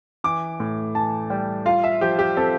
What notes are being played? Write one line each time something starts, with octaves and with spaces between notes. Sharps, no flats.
E3 D6
A2
E3 A5
G3 G5
F4 F5
E5
F3 G4
G4
C4 A4